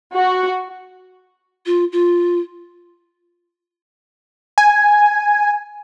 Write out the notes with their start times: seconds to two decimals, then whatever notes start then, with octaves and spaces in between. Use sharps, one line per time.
0.13 F#4
1.66 F4
1.92 F4
4.58 G#5